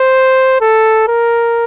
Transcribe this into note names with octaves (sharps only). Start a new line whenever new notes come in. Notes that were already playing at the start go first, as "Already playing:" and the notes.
Already playing: C5
A4
A#4